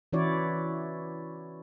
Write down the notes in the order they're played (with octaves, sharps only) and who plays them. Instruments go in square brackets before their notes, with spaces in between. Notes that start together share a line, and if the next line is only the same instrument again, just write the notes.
[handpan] E3 C#4 E4 F#4 C#5 D5